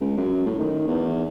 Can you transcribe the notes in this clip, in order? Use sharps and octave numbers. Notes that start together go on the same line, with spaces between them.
C#2
F#2
A2
D#3
E2